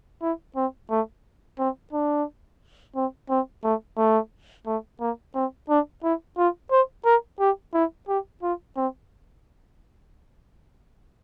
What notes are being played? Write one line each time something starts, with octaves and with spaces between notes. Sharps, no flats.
E4
C4
A3
C4
D4
C4
C4
A3
A3
A3
A#3
C4
D4
E4
F4
C5
A#4
G4
E4
G4
F4
C4